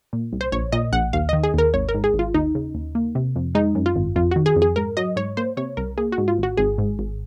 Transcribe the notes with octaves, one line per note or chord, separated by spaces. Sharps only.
A#2
C2
C5
A#1 C#5
A#2 D#5
A#1 F#5
D#2 F5
D#3 D#5
G#4
D#2 A#4
G#1 C#5
A#4
G#2
G#4
G#1
F4
D#2 D#4
C#3
D#2
A#3
C3
F2
G#3 D#4
F#2
F4
G#1
F2 F4
D#3 F#4
G#4
F2
G#4
G#2 A#4
F#3 D#5
G#2 C#5
A#3 C5
C3 C#5
C2 A#4
A#3 G#4
F#4
G#2
F4
G#1
F#4
G#1 G#4
G#2
G#1